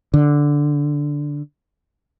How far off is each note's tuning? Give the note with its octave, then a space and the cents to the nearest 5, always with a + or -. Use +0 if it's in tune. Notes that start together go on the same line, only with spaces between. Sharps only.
D3 -5